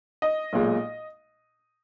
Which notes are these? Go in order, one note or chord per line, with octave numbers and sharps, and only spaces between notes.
D#5
B1 A#2 G#3